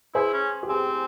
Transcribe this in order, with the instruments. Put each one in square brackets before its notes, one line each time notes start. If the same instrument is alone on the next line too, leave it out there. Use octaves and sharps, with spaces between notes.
[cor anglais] E4 [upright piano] G#4 C5
[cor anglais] C#4
[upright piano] G4
[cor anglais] C4 [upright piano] G#4